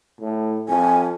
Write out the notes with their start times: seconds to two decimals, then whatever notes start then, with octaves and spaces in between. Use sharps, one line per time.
0.21 A2
0.69 F2 G#5